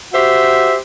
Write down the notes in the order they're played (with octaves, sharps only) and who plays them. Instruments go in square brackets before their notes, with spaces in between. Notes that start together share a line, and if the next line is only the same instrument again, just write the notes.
[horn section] F#4 G4 C5 E5